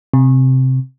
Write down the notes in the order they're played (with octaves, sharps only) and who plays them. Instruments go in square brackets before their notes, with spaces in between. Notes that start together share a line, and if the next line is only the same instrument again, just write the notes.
[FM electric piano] C3